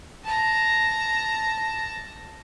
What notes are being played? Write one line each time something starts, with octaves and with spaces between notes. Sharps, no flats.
A5 A#5